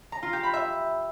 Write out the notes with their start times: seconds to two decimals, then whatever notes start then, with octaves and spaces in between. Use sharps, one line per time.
0.12 A#5
0.23 F4
0.33 G4
0.43 B5
0.54 E5